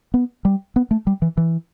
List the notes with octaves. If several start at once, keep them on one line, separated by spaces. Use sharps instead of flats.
B3
G3
B3
A3
G3
E3
E3